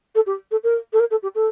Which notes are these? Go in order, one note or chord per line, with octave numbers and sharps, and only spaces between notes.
A4
G4
A4
A#4
A4
A#4
A4
G4
A4